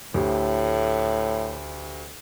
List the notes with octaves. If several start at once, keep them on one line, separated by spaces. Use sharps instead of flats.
D2 A2 G4